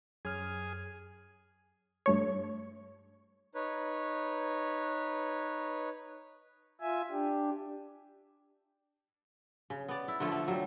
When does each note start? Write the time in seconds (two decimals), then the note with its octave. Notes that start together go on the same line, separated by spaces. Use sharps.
0.25 F#2 G#4 F6
2.06 G2 A3 C#5
3.55 D#4 B4 C#5
6.81 F4 E5 G#5
7.10 D4 G4
9.70 C#3
9.88 B3 D5
10.08 E4
10.20 D3 F3 A3 F4
10.32 A3
10.48 F#3 G3